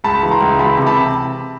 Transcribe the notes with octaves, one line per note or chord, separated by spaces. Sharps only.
C#2 A5 B5
E3
A#5 C6
C#2
E3 A5 B5
C3
A5 B5